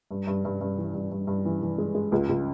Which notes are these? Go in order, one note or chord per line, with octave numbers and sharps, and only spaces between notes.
G2
G2
G2
G2
E3
G2
G2
G2
E3
E3
G#3
G#3
C#2
C#2